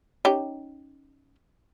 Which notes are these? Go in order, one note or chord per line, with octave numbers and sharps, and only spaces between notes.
C#4 D#4 G4